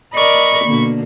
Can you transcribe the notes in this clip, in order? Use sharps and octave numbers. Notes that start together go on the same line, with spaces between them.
A#4 D5 D#5 B5 C#6
B2 D3 A#3